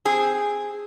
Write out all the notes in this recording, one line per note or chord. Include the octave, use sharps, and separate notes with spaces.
C4 G#4